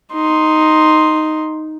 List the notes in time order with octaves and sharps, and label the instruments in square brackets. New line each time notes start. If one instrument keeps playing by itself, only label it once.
[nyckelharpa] D#4 C6